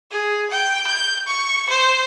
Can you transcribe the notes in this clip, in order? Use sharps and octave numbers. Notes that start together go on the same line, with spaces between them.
G#4
G5
G6
C#6
C5